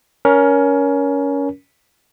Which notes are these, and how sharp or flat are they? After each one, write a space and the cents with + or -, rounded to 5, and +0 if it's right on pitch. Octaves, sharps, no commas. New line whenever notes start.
C#4 +20 A#4 +20